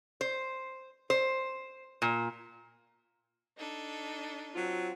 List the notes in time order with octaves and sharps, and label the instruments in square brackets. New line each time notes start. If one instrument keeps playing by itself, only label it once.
[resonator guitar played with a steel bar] C5
C5
A#2
[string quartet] D4 D#4 A4
[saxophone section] F#3 C4 F4